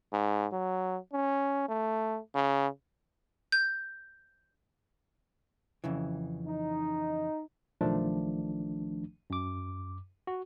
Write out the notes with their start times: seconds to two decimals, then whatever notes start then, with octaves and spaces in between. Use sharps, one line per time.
0.13 G#2
0.52 F#3
1.13 C#4
1.68 A3
2.35 C#3
3.52 G6
5.84 F2 C#3 E3
6.46 D#4
7.81 B1 D#3 F3 A3 D4
9.30 F#2 D6
10.27 F#4